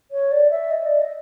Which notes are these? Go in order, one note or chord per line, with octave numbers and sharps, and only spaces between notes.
C#5
D5
E5
D#5
D5
D#5